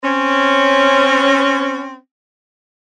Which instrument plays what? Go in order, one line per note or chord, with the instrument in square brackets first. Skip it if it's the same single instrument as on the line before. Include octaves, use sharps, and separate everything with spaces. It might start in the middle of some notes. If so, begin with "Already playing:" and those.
[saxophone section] C4 C#4